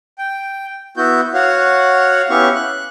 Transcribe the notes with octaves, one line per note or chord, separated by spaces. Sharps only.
G5
B3 E4 F#4 G6
F#4 C#5 F5 F#5
B3 C#4 E4 G4 F5 C#6
F#6